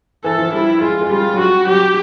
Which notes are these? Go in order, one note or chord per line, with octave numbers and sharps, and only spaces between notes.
E3 A4
F3
G3 E4
G#3 F4
G#3
G3 F4
F#3
G3 F#4
F#3 G4